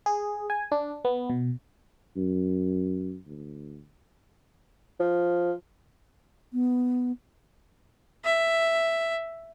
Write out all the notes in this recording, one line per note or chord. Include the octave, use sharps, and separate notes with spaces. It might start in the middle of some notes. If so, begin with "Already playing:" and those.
G#4
G#5
D4
B3
B2
F#2
D2
F3
B3
E5